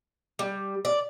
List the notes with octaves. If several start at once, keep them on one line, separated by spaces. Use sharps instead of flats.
G3
D5